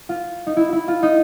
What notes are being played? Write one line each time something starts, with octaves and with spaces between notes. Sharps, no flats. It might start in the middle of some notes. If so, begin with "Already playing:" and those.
F4
D#4
E4
E4
F4
D#4